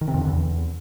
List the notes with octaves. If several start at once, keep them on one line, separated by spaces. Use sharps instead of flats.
D#3
C3
F2
D3
E2